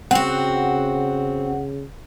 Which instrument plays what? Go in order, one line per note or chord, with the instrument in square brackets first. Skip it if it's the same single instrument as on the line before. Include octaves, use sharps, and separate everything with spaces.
[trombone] C#3 [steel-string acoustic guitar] C4 F#4 [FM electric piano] F#5